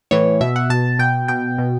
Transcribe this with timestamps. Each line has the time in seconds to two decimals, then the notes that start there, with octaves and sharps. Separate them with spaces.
0.11 A2 E3 C#5
0.41 B2 E5
0.56 F#5
0.70 B2 A5
0.99 B2 G5
1.28 B2 G5
1.58 B2